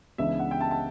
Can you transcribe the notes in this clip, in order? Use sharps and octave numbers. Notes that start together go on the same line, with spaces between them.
C#2 C#3 E3 B3 D4 E5
F#5
G5
A5
A5